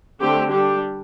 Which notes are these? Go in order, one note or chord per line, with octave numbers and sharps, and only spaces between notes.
D3 A3 C4 G4
G3 D4 G4